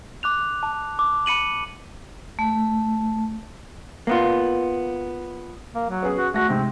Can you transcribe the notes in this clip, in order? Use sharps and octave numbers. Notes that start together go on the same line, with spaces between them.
D6 F#6 F7
A5
D6
B5 C#7 D#7 F#7
A3
A#3 B3 F4
A#3
F#3
B3 C#4 G#4
F#4
A3 F#4 A#6
G#2 C3 C4